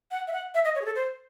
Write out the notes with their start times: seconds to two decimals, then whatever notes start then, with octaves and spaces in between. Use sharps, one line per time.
0.11 F#5
0.28 E5
0.33 F#5
0.54 E5
0.65 D#5
0.75 C#5
0.82 G#4
0.85 A4
0.96 C5